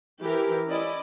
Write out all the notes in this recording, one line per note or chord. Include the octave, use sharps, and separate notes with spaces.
E3 G4 A#4
C#4 E4 D5 D#5